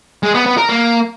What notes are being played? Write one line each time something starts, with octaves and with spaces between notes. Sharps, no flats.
G#3
B3
B3
A#4
A#3